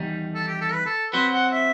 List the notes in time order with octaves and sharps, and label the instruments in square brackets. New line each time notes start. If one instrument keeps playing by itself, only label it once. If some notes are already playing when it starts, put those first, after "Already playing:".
Already playing: [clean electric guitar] E2 D#3 G3 D#4
[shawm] A4
G4
A4
B4
A4
[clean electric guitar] F#3 C4 F#4 C5 [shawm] B4
[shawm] F#5
E5